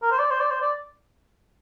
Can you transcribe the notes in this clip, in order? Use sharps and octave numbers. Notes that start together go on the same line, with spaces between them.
A#4
C5
D5
C5
D5
C5
D5